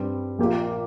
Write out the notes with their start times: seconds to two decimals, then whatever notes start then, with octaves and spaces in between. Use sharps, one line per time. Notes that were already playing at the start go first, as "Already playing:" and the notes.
Already playing: G2 G3 C4
0.39 A#1 A#2 A#3 G4